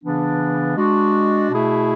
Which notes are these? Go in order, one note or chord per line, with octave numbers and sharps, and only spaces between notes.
C#3 E3 B3 D4
G#3 D4 F#4
B2 A3 E4 G#4